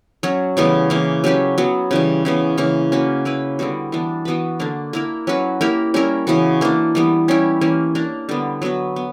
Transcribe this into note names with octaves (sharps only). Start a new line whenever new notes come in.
F#3 C#4 F#4
C#3 E3 G3 B3
C#3 E3 A#3
F#3 C#4 G4 B4
F#3 B3 F#4
C#3 E3 G3
C#3 E3 B3
C#3 E3 A#3
A#3 C#4 F#4 B4
A#3 E4 B4
D3 G3 B3 F#4
E3 B3 D4
E3 B3 F#4 B4
D3 A#3 D4
A#3 E4 A#4
F#3 C#4 F#4 B4
A#3 E4 G4 A#4
G3 C#4 E4 A#4
C#3 E3 B3 F#4
E3 A#3 D4
E3 G3 B3
G3 C#4 E4 G4
E3 A#3 C#4
A#3 D4 A#4
D3 G3 B3
F#3 B3 F#4 B4
B3